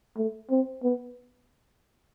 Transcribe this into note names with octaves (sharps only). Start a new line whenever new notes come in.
A3
C4
B3